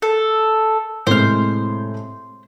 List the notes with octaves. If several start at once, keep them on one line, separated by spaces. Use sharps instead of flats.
A4
A2 C3 G#3 C5 F6